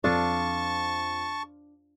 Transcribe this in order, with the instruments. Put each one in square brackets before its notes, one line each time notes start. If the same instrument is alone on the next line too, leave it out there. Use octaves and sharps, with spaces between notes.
[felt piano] F2 [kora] D4 F4 A4 [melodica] A5 C#6